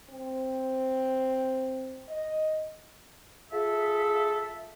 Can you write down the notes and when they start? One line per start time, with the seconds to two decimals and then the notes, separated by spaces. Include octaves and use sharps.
0.10 C4
2.08 D#5
3.51 F4 G#4 A4 E5